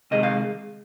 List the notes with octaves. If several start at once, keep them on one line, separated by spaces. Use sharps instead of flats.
C3 D#3 G#3 D#5
F5